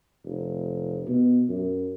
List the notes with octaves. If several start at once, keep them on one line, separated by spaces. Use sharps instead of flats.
F1
B2
F#2